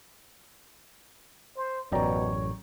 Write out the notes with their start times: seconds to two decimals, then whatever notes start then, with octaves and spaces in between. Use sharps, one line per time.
1.56 C5
1.92 A1 F#2 B2 C#5 D5 G5 A#5